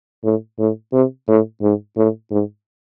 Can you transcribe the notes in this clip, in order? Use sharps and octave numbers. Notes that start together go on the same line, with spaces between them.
A2
A2
C3
A2
G#2
A2
G#2